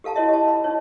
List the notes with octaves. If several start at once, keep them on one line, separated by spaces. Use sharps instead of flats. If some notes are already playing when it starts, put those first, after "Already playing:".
G4 A4 F5 A5 A#5
E4 F#4 C#5 D#5 E5
G4 A5
F5 B5
D#4 C#5